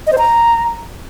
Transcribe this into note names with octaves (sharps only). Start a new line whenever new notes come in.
D#5
C5
A#5